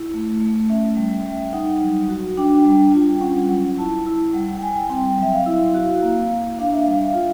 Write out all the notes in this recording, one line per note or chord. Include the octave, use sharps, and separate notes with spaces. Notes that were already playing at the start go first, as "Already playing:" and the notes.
Already playing: E4
A3
A3
C#4 E5
G3
G3
D#4 F#5
F#3
F#4
D4 G5
G3
F4 G5
C#4 F#5
F#3 F#5
E4 A5
E4
G3 F#5
G5
G3 G#5
C4 G5
F#3 E5
F5
E4
F#4
A#3
A#3
D4 F5
E5
G3 F5
F4